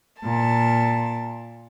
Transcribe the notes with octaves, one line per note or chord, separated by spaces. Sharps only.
A#2 A5